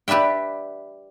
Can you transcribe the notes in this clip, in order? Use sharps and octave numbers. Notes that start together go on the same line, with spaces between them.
G4 B4 D5 E5 G5